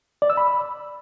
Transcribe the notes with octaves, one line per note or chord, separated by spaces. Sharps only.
D5
E6
B5